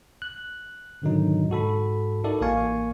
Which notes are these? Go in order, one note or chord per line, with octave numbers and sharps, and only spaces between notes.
F#6
G#2 B2 D3 D#3 F#3 D#4
G#2 F#4 A4 B5
D#4 E4 F#4 A4 A#4 D5
A1 A#3 D5 F5 G#5 C#6